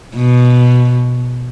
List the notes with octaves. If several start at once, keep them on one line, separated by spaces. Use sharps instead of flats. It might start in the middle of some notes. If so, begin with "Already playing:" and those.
B2